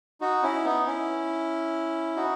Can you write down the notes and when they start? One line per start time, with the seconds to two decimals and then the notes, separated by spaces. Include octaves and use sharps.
0.21 D#4 F#4
0.43 C#4 E4
0.65 B3 D#4
0.86 C#4 E4
2.16 D#4 F#4